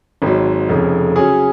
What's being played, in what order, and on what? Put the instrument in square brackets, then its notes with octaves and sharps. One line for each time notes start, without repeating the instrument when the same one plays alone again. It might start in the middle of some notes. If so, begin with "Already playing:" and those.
[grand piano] G#1 G#2 F#3
F1 F2 C#3
C#3 F#3 C#4 G#4